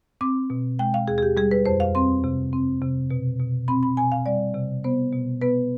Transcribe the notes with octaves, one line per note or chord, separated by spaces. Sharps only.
C4 D6
B2
G#3 G5
F5
D#2 G#4
G#4
G4
G3 G#4
B4
F2 C5
F5
C4 C6
C3
C4
C3
B2
B2
C4 B5
B5
B2 G#5
F5
G3 D5
C3
B3 C5
B2
B3 B4